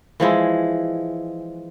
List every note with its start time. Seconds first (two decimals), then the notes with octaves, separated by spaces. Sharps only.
0.20 E3 F3 G#3 E4